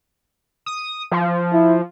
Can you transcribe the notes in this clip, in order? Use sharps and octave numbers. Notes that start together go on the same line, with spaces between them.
D#6
F3
E4